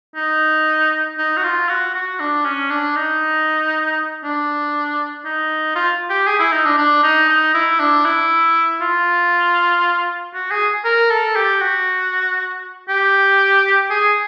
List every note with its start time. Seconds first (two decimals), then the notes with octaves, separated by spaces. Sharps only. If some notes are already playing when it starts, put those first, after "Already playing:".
0.16 D#4
1.18 D#4
1.37 F#4
1.44 F4
1.69 F#4
1.95 F#4
2.20 D4
2.45 C#4
2.71 D4
2.96 D#4
4.23 D4
5.25 D#4
5.75 F4
6.10 G4
6.27 G#4
6.39 E4
6.52 D#4
6.65 D4
6.78 D4
7.03 D#4
7.29 D#4
7.54 E4
7.79 D4
8.05 E4
8.81 F4
10.34 F#4
10.51 G#4
10.84 A#4
11.10 A4
11.36 G4
11.61 F#4
12.88 G4
13.90 G#4